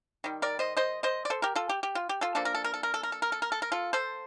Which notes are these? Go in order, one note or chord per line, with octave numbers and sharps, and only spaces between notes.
D#3 G3
A#4 D5
C5 D#5
C5 D#5
C5 D#5
D5
A4 C5
G4 A#4
F4 A4
G4
G4
F4
G4
F4 A4
F3 A#3 D4 A4
A#4
A4
A#4
A4
A#4
A4
A#4
A4
A#4
A4
A#4
A4
A#4
F4 A4
A4 C5